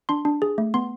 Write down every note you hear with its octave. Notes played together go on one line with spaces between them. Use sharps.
D4 C6
D4
G#4
A3
B3 C6